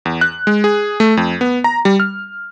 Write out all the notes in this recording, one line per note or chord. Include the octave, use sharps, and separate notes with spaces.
E2
F#6
G#3
G#4
A3
F2
B3
A#5
G3
F6